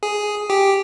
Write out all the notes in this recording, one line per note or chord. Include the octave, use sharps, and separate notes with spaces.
G#4
G4